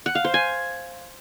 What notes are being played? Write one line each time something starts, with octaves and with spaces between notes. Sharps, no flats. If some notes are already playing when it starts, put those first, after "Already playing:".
F#5
F5
C5
G#5